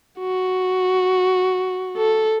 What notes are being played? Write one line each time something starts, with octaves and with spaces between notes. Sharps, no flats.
F#4
A4